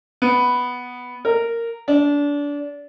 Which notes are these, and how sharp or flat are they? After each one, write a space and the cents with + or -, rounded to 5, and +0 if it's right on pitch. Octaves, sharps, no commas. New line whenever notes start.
B3 +0
A#4 -10
D4 -25